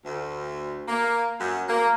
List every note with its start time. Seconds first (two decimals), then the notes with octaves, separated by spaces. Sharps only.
0.05 D2
0.88 A#3
1.39 F#2
1.68 A#3